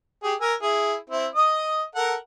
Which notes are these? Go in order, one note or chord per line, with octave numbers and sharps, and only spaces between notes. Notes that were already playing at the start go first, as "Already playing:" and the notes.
G4 G#4
A#4 G#5 E6
E4 G#4
C4 E4
D#5 D#6
A4 A#4 F#5